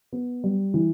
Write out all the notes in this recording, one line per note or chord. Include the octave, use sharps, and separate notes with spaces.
B3
G3
E3